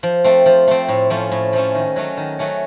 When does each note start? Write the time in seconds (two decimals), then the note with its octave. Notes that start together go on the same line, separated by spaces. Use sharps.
0.03 F3
0.24 A3 C4
0.46 F3
0.67 A3 C4
0.88 A2
1.10 F3 A3 C#4
1.31 A2
1.53 F3 A3 C#4
1.75 D#3
1.96 F#3 A3 C#4
2.17 D#3
2.39 F#3 A3 C#4